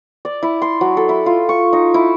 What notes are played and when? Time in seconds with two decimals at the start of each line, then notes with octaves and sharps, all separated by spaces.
0.25 D5
0.43 E4
0.62 C6
0.81 F#3
0.97 A4
1.09 E4
1.26 F4
1.49 C#6
1.73 D#4
1.94 E4